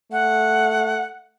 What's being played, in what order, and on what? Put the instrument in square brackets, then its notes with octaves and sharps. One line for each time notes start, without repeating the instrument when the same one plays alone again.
[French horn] A3 [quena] F#5